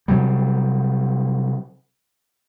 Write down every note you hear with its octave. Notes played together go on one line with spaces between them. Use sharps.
C3 F#3 G3